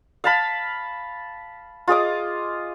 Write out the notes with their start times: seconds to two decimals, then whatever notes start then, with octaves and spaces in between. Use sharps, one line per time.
0.24 F5 A5 B5
1.87 F4 G#4 D#5 D6